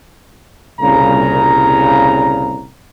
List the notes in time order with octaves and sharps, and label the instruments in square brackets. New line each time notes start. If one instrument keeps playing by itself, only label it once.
[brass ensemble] C2 A#2 C#3 A#5